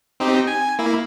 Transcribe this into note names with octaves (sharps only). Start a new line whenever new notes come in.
C4 D#4 G4
G#5
A#3 E4